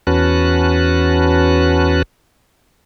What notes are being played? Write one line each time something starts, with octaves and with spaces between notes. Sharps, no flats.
E2 C#4 F#4 B4 A5 F#6